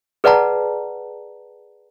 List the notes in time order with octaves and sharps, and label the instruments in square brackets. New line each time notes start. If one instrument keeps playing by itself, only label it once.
[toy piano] G#4 B4 D5 F#5 A5 A#5